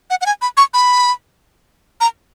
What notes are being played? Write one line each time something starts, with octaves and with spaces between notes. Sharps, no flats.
F#5
F#5
G#5
B5
C#6
B5
A#5